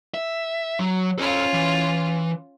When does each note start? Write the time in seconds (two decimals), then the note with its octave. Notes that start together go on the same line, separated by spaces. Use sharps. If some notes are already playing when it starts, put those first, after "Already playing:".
0.14 E5
0.79 F#3
1.18 C#4 F4 A4 C5
1.54 E3